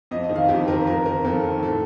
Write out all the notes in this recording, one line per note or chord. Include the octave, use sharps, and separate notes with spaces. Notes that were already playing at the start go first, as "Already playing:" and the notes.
F2 D#5
D#5
D#3
F5
F2 G4
D#3 A#4
F2 A#4
D#3 A#4
F2 A4
D#3
A2 A4